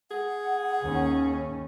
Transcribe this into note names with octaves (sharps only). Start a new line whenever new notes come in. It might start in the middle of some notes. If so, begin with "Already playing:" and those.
G#4 F#5
D#2 C#4